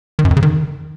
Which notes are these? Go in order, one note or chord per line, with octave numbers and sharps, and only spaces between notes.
D#3
F#2
F2
C#3
D#3